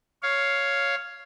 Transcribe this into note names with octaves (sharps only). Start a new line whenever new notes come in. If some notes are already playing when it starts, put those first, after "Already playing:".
C#5 F5